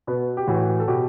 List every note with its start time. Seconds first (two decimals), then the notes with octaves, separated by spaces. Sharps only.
0.07 B2 B3
0.37 G4
0.48 A2 E3 F#4
0.80 A4
0.88 B2 G4